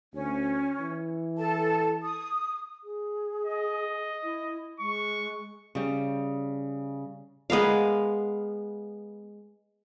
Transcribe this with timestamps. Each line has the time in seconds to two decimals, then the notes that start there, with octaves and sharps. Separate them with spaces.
0.14 D2 C#4
0.80 E3
1.39 A4 A5
2.04 D#6
2.84 G#4
3.46 D#5
4.23 E4
4.80 G#3 C#6
5.75 C#3 G3
7.50 G#3 B3 A#4 F5